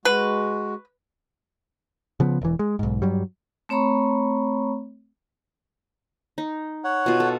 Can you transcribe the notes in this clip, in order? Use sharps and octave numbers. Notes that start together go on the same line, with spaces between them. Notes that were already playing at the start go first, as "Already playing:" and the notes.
G#3 F#4 B4
C#3 F3 B3
E1 E3
G#3
B1 G#2
G2 F#3 G3
A3 C4 C#5 A#5 B5 C#6
D#4
C#5 F#5
B2 F4
A4